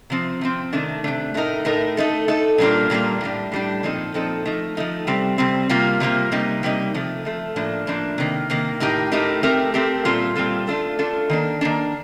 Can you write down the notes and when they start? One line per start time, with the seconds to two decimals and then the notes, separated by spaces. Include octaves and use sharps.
0.10 C3 F3 C4
0.41 C3 F3 C4
0.73 C3 D#3 A3 D4
1.04 C3 D#3 A3 D4
1.34 A2 A3 D#4 A#4
1.65 A2 A3 D#4 A#4
1.97 A3 D#4 A4
2.28 A3 D#4 A4
2.58 A#2 G3 A#3 D4 F4
2.90 A#2 G3 A#3 D4 F4
3.21 A2 G3 D4
3.52 A2 G3 D4
3.83 A#2 F3 C4 D#4 A4
4.14 A#2 F3 C4 D#4 A4
4.45 F3 A3 D#4
4.77 F3 A3 D#4
5.07 C3 G3 C4
5.38 C3 G3 C4
5.69 C3 G3 A#3 F4
6.00 C3 G3 A#3 F4
6.32 C3 G3 A#3 D#4
6.63 C3 G3 A#3 D#4
6.94 C3 F3 A3
7.25 C3 F3 A3
7.56 A2 F3 A#3 D4
7.87 A2 F3 A#3 D4
8.18 C3 D#3 A#3
8.50 C3 D#3 A#3
8.80 A2 A3 D#4 G4 A#4
9.12 A2 A3 D#4 G4 A#4
9.43 A3 C4 G4 A#4
9.74 A3 C4 G4 A#4
10.05 A#2 G3 C4 F4 A4
10.36 A#2 G3 C4 F4 A4
10.68 A3 D4 F4 A4
10.99 A3 D4 F4 A4
11.30 D#3 A#3 D4
11.61 D#3 A#3 D4